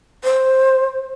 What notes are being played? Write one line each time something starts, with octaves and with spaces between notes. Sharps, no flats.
C5